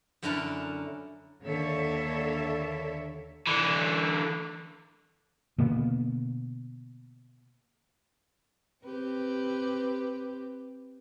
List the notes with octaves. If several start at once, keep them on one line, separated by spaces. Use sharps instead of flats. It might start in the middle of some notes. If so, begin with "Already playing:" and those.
F#2 D3 C#4 E4 A#4 A5
D#2 D3 A#3 A4 C#5 E5
D3 E3
B2 D3 A#3 B3
C4 G4 B4